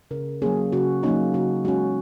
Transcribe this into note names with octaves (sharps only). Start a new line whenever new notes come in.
C#3 A#4
F#3 A#3 C#4 G#4
C#3 F#4
F#3 A#3 C#4 D#4
C#3 F#4
G#3 C#4 F#4